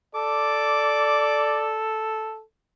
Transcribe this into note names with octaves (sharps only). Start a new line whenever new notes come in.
A4 D5 D6